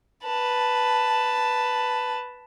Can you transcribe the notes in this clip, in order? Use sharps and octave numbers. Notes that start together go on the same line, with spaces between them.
B4 A5